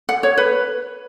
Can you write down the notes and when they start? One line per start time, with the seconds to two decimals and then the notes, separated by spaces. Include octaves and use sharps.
0.09 F#5
0.23 C#5
0.38 B4